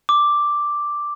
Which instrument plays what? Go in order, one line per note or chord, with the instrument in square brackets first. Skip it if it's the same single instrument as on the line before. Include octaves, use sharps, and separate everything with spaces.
[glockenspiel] D6